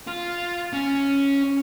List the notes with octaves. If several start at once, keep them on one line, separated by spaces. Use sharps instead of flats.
F4
C#4